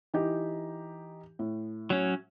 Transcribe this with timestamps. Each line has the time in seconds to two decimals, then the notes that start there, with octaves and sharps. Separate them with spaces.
0.14 E3 D#4 G4
1.39 A2
1.90 F#3 C#4